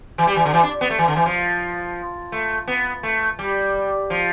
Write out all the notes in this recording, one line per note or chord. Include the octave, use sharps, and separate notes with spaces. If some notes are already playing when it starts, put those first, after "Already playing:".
E3
G3
E3
D3
E3
D4
B3
A3
E3
D3
E3
F3
A3
B3
A3
G3
F3